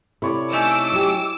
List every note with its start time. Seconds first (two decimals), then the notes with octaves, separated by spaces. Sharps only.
0.22 C3 E4 A4 C#5 D5
0.52 A3 C#4 D#4 D6 E6
0.92 F#3 G4